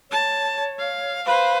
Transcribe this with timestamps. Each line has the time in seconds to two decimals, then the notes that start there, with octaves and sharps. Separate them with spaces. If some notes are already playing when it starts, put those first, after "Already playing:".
0.11 C#5 A5
0.79 F5
1.26 B4 C5 F5